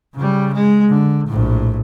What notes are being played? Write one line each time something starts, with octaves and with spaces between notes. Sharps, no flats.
C#3 G3
G#3
D3
A#1 A2